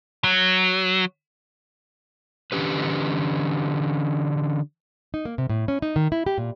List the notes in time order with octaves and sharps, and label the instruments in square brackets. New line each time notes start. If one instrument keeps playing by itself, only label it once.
[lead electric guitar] F#3
[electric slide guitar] D3 E3 C#4 G4 B4
[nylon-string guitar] D#4
A#3
C3
A2
C#4
D#4
D#3
E4
G4
A#2